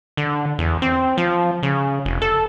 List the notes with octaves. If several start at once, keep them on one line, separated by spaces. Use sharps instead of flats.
D3
E2
C4
F3
C#3
F1
A4